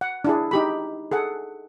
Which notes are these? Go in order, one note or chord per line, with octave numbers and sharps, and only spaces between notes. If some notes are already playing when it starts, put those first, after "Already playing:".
F#5
D4 E4 G#4
D#4 G4 B5
G#4 A4 F#5